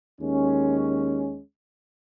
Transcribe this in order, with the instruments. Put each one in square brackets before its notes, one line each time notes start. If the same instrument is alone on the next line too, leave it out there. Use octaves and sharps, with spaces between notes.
[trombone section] D#2 G#3 C#4